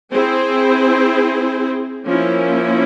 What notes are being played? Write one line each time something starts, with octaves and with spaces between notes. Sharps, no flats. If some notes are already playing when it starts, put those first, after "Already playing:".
C4 E4 G#4 C5
F3 A#3 C#4 E4